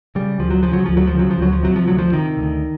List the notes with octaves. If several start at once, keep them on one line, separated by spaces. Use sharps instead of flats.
C#3 G3
D2 F3
F#3
C#3 F3
F#3
D2 F3
F#3
F3
C#3 F#3
F3
D2 F#3
F3
C3 F#3
F3
D2 F#3
F3
C3 D#3
D2